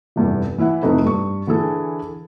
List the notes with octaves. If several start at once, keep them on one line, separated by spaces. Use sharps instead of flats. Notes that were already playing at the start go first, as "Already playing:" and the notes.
F1 E2 G2
E3 E4 E5 F#5
F2 C3 A3 B3 D#4
G2 C#6
D3 E3 G#4 A4